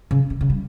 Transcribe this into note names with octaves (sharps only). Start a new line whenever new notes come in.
C#3
C#3
C#3
G3